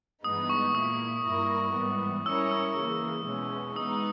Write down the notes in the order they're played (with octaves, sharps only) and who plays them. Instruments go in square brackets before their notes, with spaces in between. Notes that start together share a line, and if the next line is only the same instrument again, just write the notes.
[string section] G2 E3 G#3 B3 D#4 [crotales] D#6
[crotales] C#6
[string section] A#2 A#3 E4 [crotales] D#6
[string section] G2 G3 A#3 E4 A#4
G#2 E3 G3 B3
[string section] G3 C#4 E4 A#4 C#5 [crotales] E6
[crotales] E6
[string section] C#3 E3 A#3
E2 B2 G#3 C#4
[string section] G#3 B3 D#4 [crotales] D#6